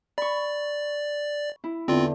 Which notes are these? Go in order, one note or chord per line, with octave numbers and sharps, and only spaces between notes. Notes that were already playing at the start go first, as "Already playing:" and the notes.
D5 B5 C#6
E4
E2 D3 C4 F4